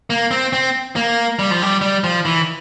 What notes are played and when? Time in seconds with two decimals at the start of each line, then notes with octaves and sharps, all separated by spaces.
0.10 A#3
0.31 C4
0.53 C4
0.96 A#3
1.39 G3
1.51 F3
1.62 G3
1.81 G3
2.04 F3
2.25 E3